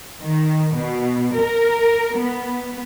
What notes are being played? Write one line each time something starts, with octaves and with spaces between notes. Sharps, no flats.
D#3
B2
A#4
B3